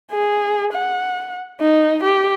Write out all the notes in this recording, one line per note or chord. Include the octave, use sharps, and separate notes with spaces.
G#4
F#5
D#4
G4